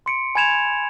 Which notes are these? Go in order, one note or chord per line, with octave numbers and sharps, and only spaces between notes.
C6 C#7 D7
G#5 B5 G#6 E7 F7